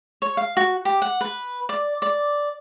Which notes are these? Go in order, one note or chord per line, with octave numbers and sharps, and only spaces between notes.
C#5
F5
F#4
G4
F#5
B4
D5
D5